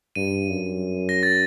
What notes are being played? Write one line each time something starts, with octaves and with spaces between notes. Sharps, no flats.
G2 D#7
F#2
A#6
A6